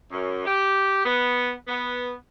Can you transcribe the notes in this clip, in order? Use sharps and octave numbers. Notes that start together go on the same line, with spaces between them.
F#2
G4
B3
B3